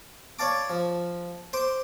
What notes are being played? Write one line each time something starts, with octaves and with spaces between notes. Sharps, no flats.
C#5 D5 F5 A5 D6
F3
C5 C6 D6